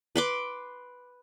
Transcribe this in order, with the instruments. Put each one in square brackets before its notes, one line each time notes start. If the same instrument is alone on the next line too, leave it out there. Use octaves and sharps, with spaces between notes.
[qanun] B4 C6 D6